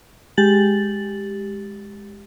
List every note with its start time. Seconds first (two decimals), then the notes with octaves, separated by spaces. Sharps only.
0.37 G#3 G4 A6 F#7